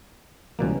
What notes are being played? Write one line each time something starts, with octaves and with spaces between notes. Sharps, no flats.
C#2 B2 E3 G3 A#3 C#4